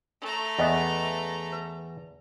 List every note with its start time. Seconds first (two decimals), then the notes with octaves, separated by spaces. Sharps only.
0.21 A3 A#5
0.59 E2 B3 D#5 E5 C#6
1.52 B4